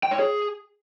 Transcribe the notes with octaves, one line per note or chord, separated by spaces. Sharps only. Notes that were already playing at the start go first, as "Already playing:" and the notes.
G5
C#5
G#4